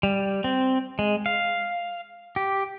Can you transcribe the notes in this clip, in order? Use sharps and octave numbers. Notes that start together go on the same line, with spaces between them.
G3
C4
G#3
F5
G4